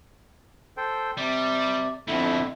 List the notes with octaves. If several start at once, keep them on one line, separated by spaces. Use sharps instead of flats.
A4 C5 G5
C3 G3 D5
F2 B2 D3 A3 E4